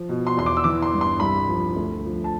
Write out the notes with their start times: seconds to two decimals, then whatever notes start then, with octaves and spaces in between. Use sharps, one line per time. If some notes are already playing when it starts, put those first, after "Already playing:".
Already playing: F3
0.09 B2
0.27 C6
0.37 E2 C6
0.46 D6
0.57 E6
0.64 E3 D6
0.82 C6
0.93 G2
1.01 C6
1.20 C2 B5
1.48 F3
1.76 D2
2.05 F3
2.24 A5